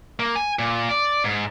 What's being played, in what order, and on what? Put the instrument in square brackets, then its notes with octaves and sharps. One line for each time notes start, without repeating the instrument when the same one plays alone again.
[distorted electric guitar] A#3
G#5
A#2
D5
G#2